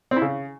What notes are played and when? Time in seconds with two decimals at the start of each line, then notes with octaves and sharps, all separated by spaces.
0.11 C4
0.17 E4
0.22 C#3